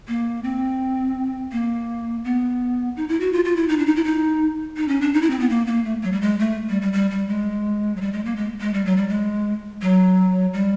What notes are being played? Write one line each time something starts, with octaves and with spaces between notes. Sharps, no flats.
A#3
C4
A#3
B3
D#4
E4
F#4
F4
F4
E4
D#4
D4
D#4
E4
D#4
D#4
C#4
D4
D#4
E4
C4
B3
A#3
A#3
A3
F#3
G3
G#3
A3
G3
G3
G3
G3
G#3
F#3
G3
G#3
A#3
G#3
G#3
G3
F#3
G3
G#3
F#3
G3